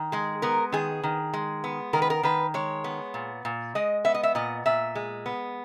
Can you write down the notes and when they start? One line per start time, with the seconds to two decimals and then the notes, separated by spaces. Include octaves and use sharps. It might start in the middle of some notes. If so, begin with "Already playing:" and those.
Already playing: D#3
0.12 G#3 G#4
0.42 B3 A#4
0.72 D#3 G#4
1.03 D#3
1.34 G#3
1.64 B3
1.93 D#3 A#4
2.02 B4
2.10 A#4
2.23 D#3 B4
2.54 G#3 C#5
2.84 B3
3.14 A#2
3.45 A#2
3.75 G#3 D#5
4.04 B3 E5
4.14 D#5
4.23 E5
4.35 A#2 D#5
4.66 A#2 E5
4.95 G#3
5.26 B3